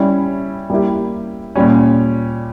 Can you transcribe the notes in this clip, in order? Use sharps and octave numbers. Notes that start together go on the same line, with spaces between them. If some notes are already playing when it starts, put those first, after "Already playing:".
Already playing: G3 C#4 E4
G3 A#3 E4 G4
A#2 G3 C#4